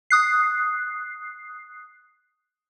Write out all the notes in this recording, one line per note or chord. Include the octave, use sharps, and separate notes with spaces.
D#6 F#6 C7